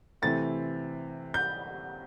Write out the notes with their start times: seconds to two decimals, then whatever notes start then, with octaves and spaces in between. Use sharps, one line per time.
0.22 C3 E3 A3 C4 A6
1.34 G6